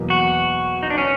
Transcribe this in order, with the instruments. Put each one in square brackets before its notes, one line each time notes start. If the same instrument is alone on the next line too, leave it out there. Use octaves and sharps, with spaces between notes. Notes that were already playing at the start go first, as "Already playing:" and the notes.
Already playing: [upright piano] E2 B2 F#3 A#3
[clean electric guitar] F#4
D#4
D4
C#4